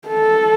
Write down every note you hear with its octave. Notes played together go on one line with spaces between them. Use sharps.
A4